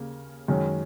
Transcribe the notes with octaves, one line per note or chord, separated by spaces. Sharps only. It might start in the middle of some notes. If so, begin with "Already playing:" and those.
Already playing: D#2 C#3 A#3
F#2 D#3 G#3 C#4